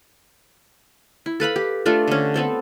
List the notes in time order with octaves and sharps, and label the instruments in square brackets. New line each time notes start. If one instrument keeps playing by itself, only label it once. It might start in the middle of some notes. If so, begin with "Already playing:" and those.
[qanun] E4
A4 B4 F5 B5
G4
A3 D4 F4 A4
D3 C#4
B3 C4 A4 C5